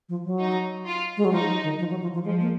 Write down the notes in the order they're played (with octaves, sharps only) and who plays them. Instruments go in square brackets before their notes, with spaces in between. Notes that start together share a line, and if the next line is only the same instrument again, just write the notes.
[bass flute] F3
F#3
[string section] D#4
F4
[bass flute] G#3
F#3
[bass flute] F3 [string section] D#4
[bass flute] F#3
D#3
F3
F#3
F3
F3
[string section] F3 [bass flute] G#3
[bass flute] A#3